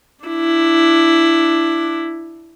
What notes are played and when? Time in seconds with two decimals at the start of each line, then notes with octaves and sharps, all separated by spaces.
0.24 D4 E4